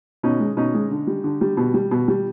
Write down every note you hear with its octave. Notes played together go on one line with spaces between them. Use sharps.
B2 C#4 D#4
G#3
B2 C#4 D#4
G#3
D3
G3
D3
G3
B2
G3
B2
G3